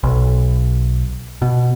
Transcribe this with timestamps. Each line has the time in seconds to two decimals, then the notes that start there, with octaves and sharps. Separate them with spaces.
0.03 B1
1.42 B2